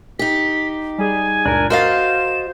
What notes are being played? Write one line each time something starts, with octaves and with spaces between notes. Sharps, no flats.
D#4 G4 B6
G3 G#4 G#5
C#2 F#2 A#2 D4 A#4
F#4 A#4 C5 D#5 F5 A6 E7